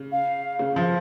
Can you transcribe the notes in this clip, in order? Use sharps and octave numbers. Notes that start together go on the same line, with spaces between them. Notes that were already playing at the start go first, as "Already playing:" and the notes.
Already playing: C#3
F5
C#3
F3